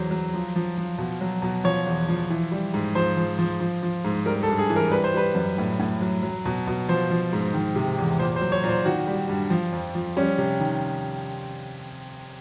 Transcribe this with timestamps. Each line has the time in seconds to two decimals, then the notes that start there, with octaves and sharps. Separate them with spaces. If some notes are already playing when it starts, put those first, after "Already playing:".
Already playing: E2 F#3 C5
0.11 F#3
0.34 F3
0.56 F3
0.77 F3
0.98 B2
1.21 F#3
1.42 B2
1.64 F3 C#5
1.86 E2
2.09 F3
2.30 E3
2.52 G3
2.74 G#2
2.95 F3 C5
3.17 F3
3.39 F3
3.60 F3
3.83 F3
4.05 G#2
4.26 G3 A#4
4.43 A4
4.48 G2
4.59 G#4
4.70 E3
4.76 A#4
4.92 G3 B4
5.04 C5
5.14 G3 B4
5.35 F#2
5.58 A2
5.80 A2
6.01 F#3
6.23 F#3
6.45 B2
6.67 B2
6.88 F3 C5
7.10 F3
7.33 G#2
7.54 D#3
7.76 C3
7.98 E2
8.19 A#2 C5
8.36 C5
8.41 F#3
8.52 C#5
8.64 A#2
8.69 C5
8.86 D#3 F#4
9.07 G3
9.29 G2
9.50 F3
9.72 F2
9.95 F3
10.17 G3 C#4
10.38 C3
10.60 D#3